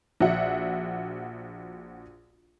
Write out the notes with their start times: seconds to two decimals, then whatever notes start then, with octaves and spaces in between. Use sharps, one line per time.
0.20 A#1 F#4 E5 F#5